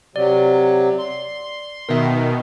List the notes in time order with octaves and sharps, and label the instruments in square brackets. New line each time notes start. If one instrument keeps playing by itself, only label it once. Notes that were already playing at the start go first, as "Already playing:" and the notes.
[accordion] C3 F#3 [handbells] D5
[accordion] C6
[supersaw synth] B2 D#3 [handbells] A#4 E5